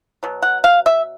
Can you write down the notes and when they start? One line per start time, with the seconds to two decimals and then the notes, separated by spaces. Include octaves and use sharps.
0.23 B2 F#3
0.42 F#5
0.64 F5
0.86 E5